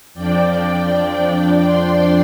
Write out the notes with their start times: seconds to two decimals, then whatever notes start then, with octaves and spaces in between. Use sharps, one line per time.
0.14 F2 F3 D4 D5 G5
1.65 G5 C6